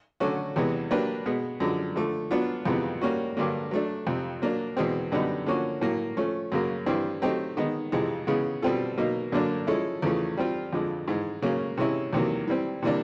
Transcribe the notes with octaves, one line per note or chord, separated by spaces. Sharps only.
D3 F#3 A3 C#4 F#4
E2 C3 E3 G#3 B3
F#3 A#3 D4 G4 B4
B2 G#3 B3
F#2 D3 F3 G#3
D3 F3 A3
F#3 B3 D4 F4
F2 C3 E3 G#3 B3
G3 A#3 C#4 F#4
G2 D3 F#3 A#3
F#3 A3 D4
F2 C3 F3
F#3 A#3 D4
E2 B2 G#3 C4
F#2 D3 G3 B3 D#4
D3 F3 A#3 C#4 F#4
A2 F#3 A#3
F3 A3 C#4
F#2 C#3 F#3 A#3
G2 E3 G3 C4
F#3 A3 C4 D#4 G4
D#3 G#3 B3 D#4
F2 C3 E3 G#3
C#3 E3 G#3 B3
B2 G3 C4 F4 A4
B2 F#3 A#3 D#4
F#2 D3 F#3 A#3 D4
F3 G#3 C#4 E4 A4
E2 C#3 F3 A3
G3 C4 F4
F2 D3 F3 G#3
G#2 E3 G#3
C#3 F#3 A#3 C#4
C3 E3 G#3 C#4 E4
E2 C3 D#3 F#3 A#3
E3 G3 C4
C3 E3 G3 A#3 D4